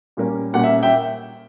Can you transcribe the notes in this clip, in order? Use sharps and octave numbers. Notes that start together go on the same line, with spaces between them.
A#2 G3 A#3 C#4
A#2 G3 A#3 C#4 F#5
E5
E5 G5